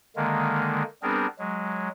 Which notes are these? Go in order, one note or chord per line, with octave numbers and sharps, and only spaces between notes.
D3 D#3 G#3 A#3
G3 B3 C4 D4 G#4 A#4
F#3 G#3